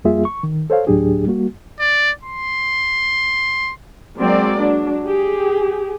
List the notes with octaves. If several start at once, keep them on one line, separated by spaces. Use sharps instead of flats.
F2 G3 A#3 F4 G#4 E5
C#6
D#3
A4 C5 C#5 F5
D2 A2 F#3 D4 G4 G#4
G3 A#3 F#4
D5
C6
F#3 G#3 A#3 C4 D5
F#3 D4
G4 G#4